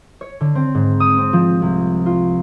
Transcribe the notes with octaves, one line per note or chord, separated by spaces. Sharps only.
C#5
D3
C4
G#2
D#6
C4
F3
C2
F4